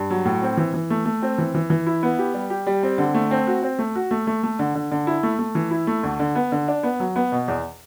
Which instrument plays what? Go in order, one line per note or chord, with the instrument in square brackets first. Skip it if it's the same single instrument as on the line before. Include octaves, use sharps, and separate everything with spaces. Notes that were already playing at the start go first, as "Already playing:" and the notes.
Already playing: [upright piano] G2
F#3
A2
C4
E3
E3
A3
A3
C4
E3
E3
E3
E4
B3
G4
G3
G4
G3
C4
D3
A3
C4
F#4
C4
A3
F#4
A3
A3
A3
D3
D3
D3
E4
A3
A3
E3
E4
A3
D2
D3
B3
D3
D4
B3
F#3
B3
B2
E2